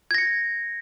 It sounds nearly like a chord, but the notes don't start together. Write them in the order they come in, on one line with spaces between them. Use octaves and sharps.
G#6 A#6 C#7